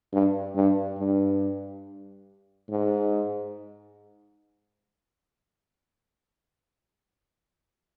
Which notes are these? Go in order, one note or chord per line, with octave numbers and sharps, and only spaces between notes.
G2
G2
G2
G#2